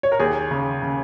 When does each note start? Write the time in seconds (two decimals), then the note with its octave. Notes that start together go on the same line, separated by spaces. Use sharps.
0.03 C#5
0.12 A#4
0.20 D#2 G#4
0.51 C#3
0.82 C#3